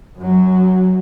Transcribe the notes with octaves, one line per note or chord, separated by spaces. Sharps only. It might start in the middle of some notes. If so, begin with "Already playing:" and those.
F#2 F#3